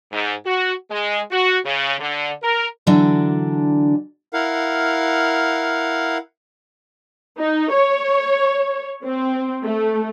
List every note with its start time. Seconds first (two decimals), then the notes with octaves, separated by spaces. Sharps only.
0.12 G#2
0.45 F#4
0.90 G#3
1.31 F#4
1.65 C#3
1.99 D3
2.43 A#4
2.87 D3 E3 F#3 D4
4.33 E4 A#4 F5 F#5
7.39 D#4
7.72 C#5
9.04 C4
9.64 A3